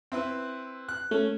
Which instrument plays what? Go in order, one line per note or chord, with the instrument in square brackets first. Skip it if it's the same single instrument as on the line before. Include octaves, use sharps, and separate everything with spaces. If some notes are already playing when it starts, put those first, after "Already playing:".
[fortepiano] C4 E4 B4
F#6
[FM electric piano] A3 [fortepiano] C#4